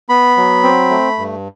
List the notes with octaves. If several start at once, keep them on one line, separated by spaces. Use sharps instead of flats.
B3 B5
F#3
C4
A3
G2